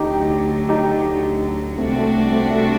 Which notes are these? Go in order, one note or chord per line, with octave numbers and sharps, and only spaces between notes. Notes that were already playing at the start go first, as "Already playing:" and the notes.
Already playing: D2 D3 F#3 D#4 G4
D#4 G4
C2 C3 G3 A3 C4 D4 F#4
A3 C4
A3 C4
A3 C4
A3